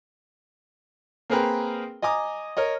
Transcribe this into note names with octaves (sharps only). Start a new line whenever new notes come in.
A#3 C4 G#4 A#4 B4 G5
D#5 G#5 A#5 D6 D#6
A#4 C#5 D#5